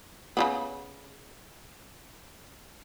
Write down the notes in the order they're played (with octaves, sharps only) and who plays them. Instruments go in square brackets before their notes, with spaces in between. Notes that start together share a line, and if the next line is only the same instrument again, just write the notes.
[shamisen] C#3 G3 B3